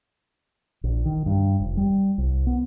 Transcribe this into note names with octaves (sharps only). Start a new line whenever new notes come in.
A#1
D#3
G2
F1
G3
C2
B3